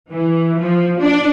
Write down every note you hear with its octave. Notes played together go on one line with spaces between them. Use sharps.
E3
F3
D4